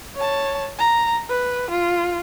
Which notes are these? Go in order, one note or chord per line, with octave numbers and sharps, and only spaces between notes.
C#5 A5
A#5
B4
F4